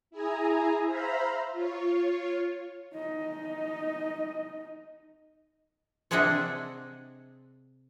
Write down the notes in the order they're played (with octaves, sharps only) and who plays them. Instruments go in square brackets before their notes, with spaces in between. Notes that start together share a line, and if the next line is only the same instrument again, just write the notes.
[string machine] E4 G#4 G#5 A#5
C5 E5 F5 A#5 B5
F4 C#5
[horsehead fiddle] D#4 D#5
[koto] C3 D4 G#4 D#5 E5 F#5